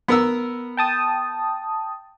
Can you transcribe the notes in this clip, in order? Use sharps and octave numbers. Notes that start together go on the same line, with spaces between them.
B3 A#4 E6
G5 A5 D#6